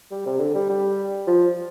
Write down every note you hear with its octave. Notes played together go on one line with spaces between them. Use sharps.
G3
C3
D3
G3
G3
F3